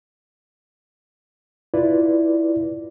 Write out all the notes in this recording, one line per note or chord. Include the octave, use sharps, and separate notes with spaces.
E4 F4 B4 D5